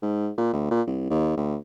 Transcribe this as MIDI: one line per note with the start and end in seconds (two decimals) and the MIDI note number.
0.02 0.29 44
0.38 0.49 46
0.53 0.69 38
0.71 0.81 46
0.87 1.06 36
1.10 1.35 39
1.37 1.56 38